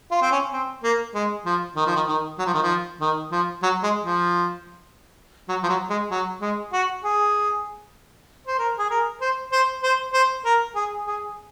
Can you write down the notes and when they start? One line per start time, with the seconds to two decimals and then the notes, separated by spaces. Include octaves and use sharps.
0.11 F4
0.22 C4
0.32 C#4
0.53 C4
0.83 A#3
1.15 G#3
1.46 F3
1.76 D#3
1.86 F3
1.96 D#3
2.07 D#3
2.38 F#3
2.46 F3
2.54 D#3
2.63 F3
3.01 D#3
3.31 F3
3.63 F#3
3.83 G#3
4.03 F3
5.49 F#3
5.63 F3
5.69 F#3
5.90 G#3
6.11 F#3
6.41 G#3
6.73 F#4
7.04 G#4
8.47 C5
8.59 A#4
8.79 G#4
8.90 A#4
9.21 C5
9.52 C5
9.83 C5
10.13 C5
10.45 A#4
10.75 G#4
11.07 G#4